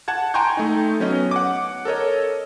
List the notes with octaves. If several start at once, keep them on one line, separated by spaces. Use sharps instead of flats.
F#5 A5 G#6
G5 G#5 A#5 C6 C#6 G6
A3 D#4
F#3 B3 C#4 B4 D#5
F#5 D6
A4 A#4 C#5 D#5